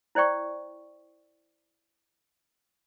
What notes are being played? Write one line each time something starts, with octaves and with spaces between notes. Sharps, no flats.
E4 C5 D5 G5 C#6